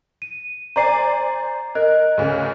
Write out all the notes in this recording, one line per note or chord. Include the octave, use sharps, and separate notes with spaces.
D#7
C5 D5 G#5 A#5 C7
A#4 D#5 F#6
D2 C#3